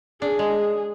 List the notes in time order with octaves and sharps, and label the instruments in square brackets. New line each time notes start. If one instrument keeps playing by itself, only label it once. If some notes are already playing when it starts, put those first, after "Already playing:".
[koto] D4 [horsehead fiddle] G#4
[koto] G#3